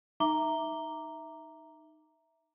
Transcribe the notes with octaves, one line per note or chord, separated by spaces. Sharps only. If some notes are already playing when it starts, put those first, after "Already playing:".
D#4 E5 A#5 D6 G7